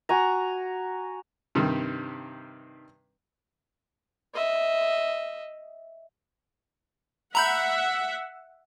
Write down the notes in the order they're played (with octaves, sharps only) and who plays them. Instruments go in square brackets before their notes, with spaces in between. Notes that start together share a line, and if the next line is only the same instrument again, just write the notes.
[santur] F#4 G#5 A#5
[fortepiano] G2 C3 D#3 G3
[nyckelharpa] D#5 E5
[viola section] E5 F#5 [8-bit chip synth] A#5 B5 G6